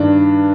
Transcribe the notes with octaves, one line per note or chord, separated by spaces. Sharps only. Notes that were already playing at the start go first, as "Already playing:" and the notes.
Already playing: G2 D#3 D4